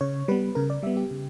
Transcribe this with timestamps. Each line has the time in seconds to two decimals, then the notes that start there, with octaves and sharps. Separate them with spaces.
0.01 C#3 C#5
0.28 G3 B3 B4
0.55 C#3 A#4
0.70 D5
0.83 G3 B3 E5
0.97 G4
1.11 C#3